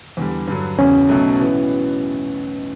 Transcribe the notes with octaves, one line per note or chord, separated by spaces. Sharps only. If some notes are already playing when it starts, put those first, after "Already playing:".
E2 D3 G3
G2 D3 F#3
E1 E2 C#3 C#4
B1 B2 F#3 A3
A2 E3 B3 F#4